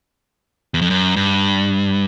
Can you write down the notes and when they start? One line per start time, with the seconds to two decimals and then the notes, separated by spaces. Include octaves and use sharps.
0.74 E2
0.82 F2
0.90 F#2
1.16 G2